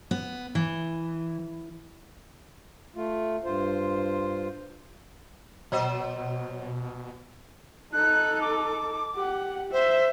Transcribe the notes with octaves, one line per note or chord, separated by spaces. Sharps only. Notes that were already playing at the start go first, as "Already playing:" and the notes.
B3
E3
A3 F4
G2 F4 C5
B2 F#3 C5 D#5
D#4 A4 F#6
D6
G4 F#5
C5 E5